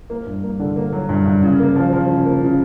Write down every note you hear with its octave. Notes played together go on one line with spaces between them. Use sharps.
A#3
G2
A#3
D3
A#3
F#3
G2
G2
C#3
A#3
F3
F3
C#3
A#3
C#3